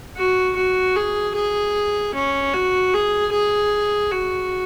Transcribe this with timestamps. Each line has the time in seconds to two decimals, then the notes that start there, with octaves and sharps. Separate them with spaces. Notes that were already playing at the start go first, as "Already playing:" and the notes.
0.17 F#4
0.56 F#4
0.96 G#4
1.35 G#4
2.15 C#4
2.54 F#4
2.94 G#4
3.32 G#4
4.11 F#4